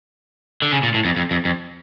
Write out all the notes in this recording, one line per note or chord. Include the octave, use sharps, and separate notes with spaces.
D3
C#3
A#2
A2
F2
F2
F2
F2